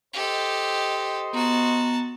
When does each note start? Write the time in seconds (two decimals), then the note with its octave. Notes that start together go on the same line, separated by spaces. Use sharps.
0.13 G4 A4 C5 D#5
1.33 B3 F#4 A5 A#5